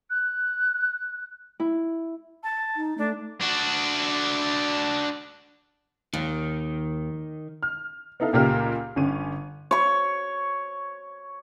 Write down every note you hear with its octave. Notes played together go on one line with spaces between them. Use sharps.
F#6
E4
A5
D#4
A3 D4
D4 F#4
D#2 D#3
F6
B3 D#4 E4 A4 F5
C#2 A#2 A#3 G4 A#4 F6
G1 C#4 D#7
C#5 C#6